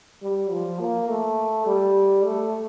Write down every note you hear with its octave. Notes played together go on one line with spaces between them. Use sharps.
G3
F3
A#3
A3
G3
A3